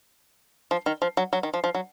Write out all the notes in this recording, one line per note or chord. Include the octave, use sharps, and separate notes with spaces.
F3
D#3
F3
F#3
F#3
D#3
F3
F3
F#3